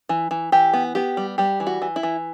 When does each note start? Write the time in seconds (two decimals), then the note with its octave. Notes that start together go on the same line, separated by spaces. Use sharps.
0.09 E3
0.31 E3
0.52 E3 G4
0.74 B3
0.95 B3 G4
1.17 G3
1.38 G3 G4
1.60 E3
1.67 F#4
1.82 E3
1.96 E4
2.03 E3